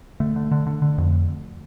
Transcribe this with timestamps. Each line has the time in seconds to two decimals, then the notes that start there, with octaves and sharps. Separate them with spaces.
0.20 D3 A3
0.36 D3
0.51 D3
0.67 D3
0.82 D3
0.98 F2